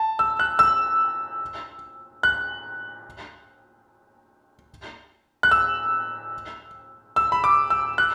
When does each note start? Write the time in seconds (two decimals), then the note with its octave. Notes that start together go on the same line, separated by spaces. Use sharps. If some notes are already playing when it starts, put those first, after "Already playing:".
Already playing: A5
0.19 E6
0.39 F#6
0.59 E6
2.23 F#6
5.43 F#6
5.51 E6
7.16 E6
7.32 B5
7.44 D6
7.70 E6
7.98 F#6